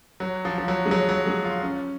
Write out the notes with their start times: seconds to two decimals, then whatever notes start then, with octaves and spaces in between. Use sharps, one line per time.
0.20 F#3
0.45 F3
0.58 F3
0.68 F#3
0.86 G#3
0.91 F#3
1.09 F#3
1.27 G#3
1.44 F4
1.62 C#4